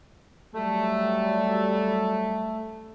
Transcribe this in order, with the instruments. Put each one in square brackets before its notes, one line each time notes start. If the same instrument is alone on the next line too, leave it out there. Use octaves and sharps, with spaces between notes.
[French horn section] F#3 G3 [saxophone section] A3